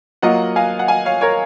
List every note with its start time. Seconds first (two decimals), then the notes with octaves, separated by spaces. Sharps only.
0.22 F#3 A#3 F4 D#5 F#5
0.56 F5 G#5
0.79 F#5
0.88 F5 G#5
1.05 C#5 F5
1.21 A#4 C#5